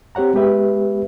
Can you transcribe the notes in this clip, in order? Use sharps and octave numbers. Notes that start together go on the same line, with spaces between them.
C4 G4 C#5 F#5 A#5
G#3 B3 G4 B4 E5